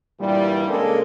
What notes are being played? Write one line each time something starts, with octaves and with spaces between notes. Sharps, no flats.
G2 A#2 E3 G3
C#3 G#3 A#3 D4 A4 A#4